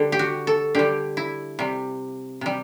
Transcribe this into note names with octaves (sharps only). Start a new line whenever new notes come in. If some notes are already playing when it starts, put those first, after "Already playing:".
Already playing: D3 G3
G4
F#4
A4
D3 G3 G4
E4
C3 G3
C3 G3